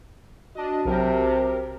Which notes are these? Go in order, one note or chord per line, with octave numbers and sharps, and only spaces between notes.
D4 F#4 D#5 A5
B1 C3 F#3 G4 A#4